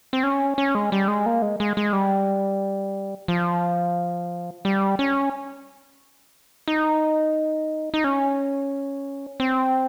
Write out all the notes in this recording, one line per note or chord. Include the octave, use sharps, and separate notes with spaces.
C4
C#4
C#4
G#3
G3
G#3
A#3
G#3
G#3
G#3
G3
F3
G3
C#4
D#4
D#4
C#4
C4